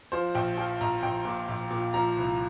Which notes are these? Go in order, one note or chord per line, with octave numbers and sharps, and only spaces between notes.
F3 C5
A#1 G5
F3 G5
A#1 A#5
A#1 G5
A#2
A#1
A#2
F3 A#5
C2